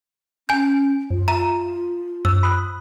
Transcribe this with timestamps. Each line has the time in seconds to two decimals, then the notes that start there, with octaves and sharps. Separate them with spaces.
0.49 C#4 G#5 G6
1.11 F#2 F4
1.28 E5 A#5 D#7
2.25 F#2 E6
2.43 B5 D#6 F#6